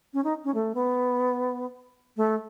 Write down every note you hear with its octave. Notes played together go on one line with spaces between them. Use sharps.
C#4
D#4
C#4
A3
B3
A3